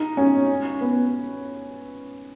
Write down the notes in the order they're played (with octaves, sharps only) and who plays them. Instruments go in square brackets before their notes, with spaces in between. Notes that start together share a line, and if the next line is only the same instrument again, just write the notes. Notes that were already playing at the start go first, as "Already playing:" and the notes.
Already playing: [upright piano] D#4
C#4
B3